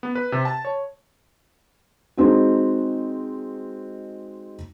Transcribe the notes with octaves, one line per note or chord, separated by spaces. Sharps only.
B3
B4
C3
A5
C#5
G#3 C4 D#4 F#4